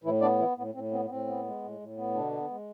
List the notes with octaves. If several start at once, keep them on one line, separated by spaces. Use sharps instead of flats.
A2 E3 E4
B3 D4 D5
E3 E4
A2 B3
A2 C4
B3 C4
B3
A2 C4
B3
G#3
A2
A2
B3
B2 D3 D4
B3
G#3